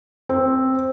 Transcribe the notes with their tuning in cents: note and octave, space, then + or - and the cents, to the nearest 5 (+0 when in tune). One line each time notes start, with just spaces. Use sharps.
C4 +5